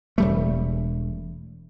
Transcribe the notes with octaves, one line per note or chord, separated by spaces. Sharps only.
E1 G3 A3